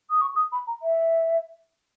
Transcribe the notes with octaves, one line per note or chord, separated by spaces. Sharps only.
D#6
C#6
D#6
B5
A#5
E5